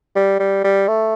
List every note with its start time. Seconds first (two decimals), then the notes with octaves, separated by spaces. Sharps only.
0.15 G3
0.39 G3
0.64 G3
0.88 A3